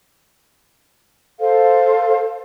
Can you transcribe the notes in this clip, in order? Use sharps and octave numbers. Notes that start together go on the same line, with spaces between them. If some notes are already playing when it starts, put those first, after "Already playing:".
A4 C5 F5